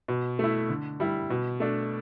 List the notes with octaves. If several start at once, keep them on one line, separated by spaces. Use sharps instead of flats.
B2
A3 E4
D3
G3 E4
B2
A3 D4